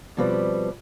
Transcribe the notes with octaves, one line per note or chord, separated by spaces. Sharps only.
B2 F3 G3 C4 B4 D5